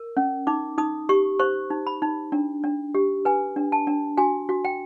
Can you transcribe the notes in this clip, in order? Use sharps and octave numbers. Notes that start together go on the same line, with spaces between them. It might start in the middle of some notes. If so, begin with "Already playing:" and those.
Already playing: A#4
C#4
D#4 D6
D#4 D#6
G4 C#6
C5 C#6
D#4
B5
D#4
D4
D4
G4
B4 G#5
D4
A5
D4
F#4 G#5
F#4
G5